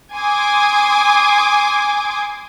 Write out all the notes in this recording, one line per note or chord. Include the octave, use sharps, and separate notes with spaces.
G#5 C6 D6 D#6